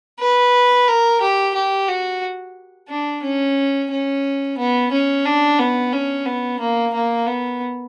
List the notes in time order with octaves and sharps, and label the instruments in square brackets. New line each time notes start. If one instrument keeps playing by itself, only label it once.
[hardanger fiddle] B4
A#4
G4
G4
F#4
D4
C#4
C#4
B3
C#4
D4
B3
C#4
B3
A#3
A#3
B3